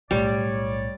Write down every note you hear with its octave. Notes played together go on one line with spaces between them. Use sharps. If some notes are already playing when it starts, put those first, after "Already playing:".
B1 A2 G3 C#5 D5